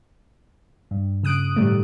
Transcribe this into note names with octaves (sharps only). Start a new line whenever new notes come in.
G2
C#3 D#6 F#6 D7
A2 D#3 G3 A3